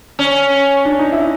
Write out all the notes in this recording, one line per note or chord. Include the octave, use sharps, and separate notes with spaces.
C#4
D4
D#4
E4